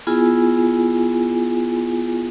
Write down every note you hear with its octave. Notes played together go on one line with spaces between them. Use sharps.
B3 E4 F4 G#4 G#5